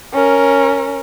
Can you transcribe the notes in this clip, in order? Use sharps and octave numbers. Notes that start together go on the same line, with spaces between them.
C#4 A#4